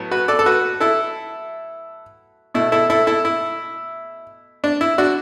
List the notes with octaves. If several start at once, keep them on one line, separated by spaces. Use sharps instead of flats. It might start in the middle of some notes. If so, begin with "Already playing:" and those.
Already playing: A2 F#3 B3
F#4 B4
A4 D5
A4
F#4 B4
E4 A4
B2 A3 E4
E4 A4
E4 A4
E4 A4
E4
D4
E4
D4 F#4